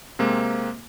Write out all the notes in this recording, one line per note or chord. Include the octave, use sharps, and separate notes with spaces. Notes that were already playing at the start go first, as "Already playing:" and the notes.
C3 G#3 A#3 C4